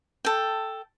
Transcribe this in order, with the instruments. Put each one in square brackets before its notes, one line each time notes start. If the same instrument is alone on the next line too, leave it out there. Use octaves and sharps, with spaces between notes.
[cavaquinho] A4 G5